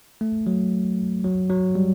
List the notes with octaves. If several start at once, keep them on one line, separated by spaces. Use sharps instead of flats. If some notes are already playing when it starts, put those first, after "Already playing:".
A3
F#3
F#3
F#3
G3